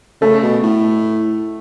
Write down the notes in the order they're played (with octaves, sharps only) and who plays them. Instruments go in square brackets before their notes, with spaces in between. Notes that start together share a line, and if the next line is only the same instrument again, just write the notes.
[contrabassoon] C#3 [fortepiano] A3
[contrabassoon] B2
A2